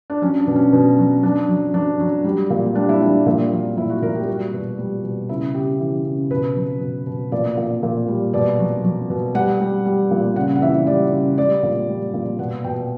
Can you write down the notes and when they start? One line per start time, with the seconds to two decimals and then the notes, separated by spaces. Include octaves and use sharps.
0.10 D4
0.22 F#3 C#4
0.39 D4
0.47 B2
0.56 C#4
0.73 B2
0.98 F#3
1.23 F#3 D4
1.49 F#3
1.74 F#3 D4
2.00 F#3
2.24 G3
2.50 A#2
2.75 G3 D4
2.89 E4
3.01 G3 D4
3.26 A#2
3.52 F#3
3.77 A#2 E4
3.89 F#4
4.02 A#2 A#4
4.15 G4
4.28 G3 F#4
4.53 B2
4.78 G3
5.04 B2
5.29 C#3 E4
5.54 C#3 G4
5.80 E3
6.05 C#3
6.30 B2 B4
6.56 F#3
6.81 B2
7.06 B2
7.32 A#2 D5
7.57 A#2
7.83 A#2
8.08 G3
8.34 B2 D5
8.59 F#3
8.84 F#3
9.10 B2
9.35 G3 F#5
9.60 G3
9.85 G3
10.11 A#2
10.36 C#3 F#5
10.55 F#5
10.62 E3 E5
10.87 G3 D5
11.12 C#3
11.38 G3 D5
11.63 A#2
11.88 G3
12.14 A#2
12.39 B2 F#5
12.64 B2 G5